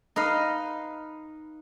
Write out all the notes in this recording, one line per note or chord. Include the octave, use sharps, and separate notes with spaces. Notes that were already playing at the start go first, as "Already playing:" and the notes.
D#4 B4 D#5 F5